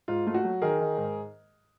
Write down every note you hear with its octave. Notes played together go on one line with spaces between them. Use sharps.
G#2 F4
A3 F4
F#4
F#3
D#3 G#4 A#4
D#3
G#2